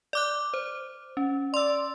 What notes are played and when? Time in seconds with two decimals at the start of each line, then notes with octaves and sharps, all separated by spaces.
0.13 D5 D6 F#6
0.54 C5
1.17 C#4
1.54 D5 C6 E6